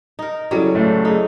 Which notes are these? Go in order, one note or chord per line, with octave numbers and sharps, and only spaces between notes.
D#4 A#4
C#3 F#3 G3 E4 A4 D5
F#1 A2 A3
D#4 G#4 A4